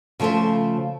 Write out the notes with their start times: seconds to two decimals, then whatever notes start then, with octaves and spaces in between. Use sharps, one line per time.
0.20 C#3 F3 A3 F4 C5